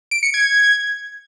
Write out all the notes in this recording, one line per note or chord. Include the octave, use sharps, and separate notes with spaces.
D7
C#7
G#6